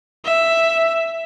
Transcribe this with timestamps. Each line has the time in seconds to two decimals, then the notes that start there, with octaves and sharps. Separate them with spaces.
0.25 E5